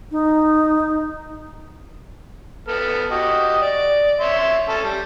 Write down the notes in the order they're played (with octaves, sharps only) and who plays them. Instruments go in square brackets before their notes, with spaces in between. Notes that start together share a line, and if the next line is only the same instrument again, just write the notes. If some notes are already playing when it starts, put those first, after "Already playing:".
[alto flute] D#4
[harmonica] B3 A4 F6
F#4 G4 D#5
D5
C#5 E5 C6
C#4 A4 A5
G3